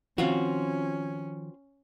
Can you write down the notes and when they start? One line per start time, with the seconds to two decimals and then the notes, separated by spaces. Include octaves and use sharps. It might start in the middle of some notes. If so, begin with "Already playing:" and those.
0.18 D#3 F3 C4 C#4 F4 F#4